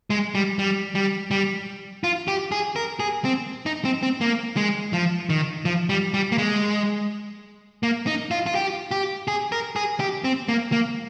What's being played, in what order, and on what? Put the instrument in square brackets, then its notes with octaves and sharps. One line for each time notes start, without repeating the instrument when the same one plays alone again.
[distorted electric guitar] G#3
G3
G3
G3
G3
F4
G4
G#4
A#4
G#4
C4
D#4
C4
C4
A#3
G#3
F3
D#3
F3
G3
G3
A#3
G#3
A#3
D#4
F4
F4
G4
G4
G#4
A#4
G#4
G4
C4
A#3
A#3